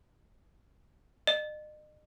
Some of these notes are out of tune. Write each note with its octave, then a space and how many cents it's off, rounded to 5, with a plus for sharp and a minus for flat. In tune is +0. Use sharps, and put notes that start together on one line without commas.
D#5 -40